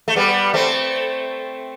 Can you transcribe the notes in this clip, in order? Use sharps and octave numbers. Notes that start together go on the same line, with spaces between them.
A3
G3 B3
A3 C4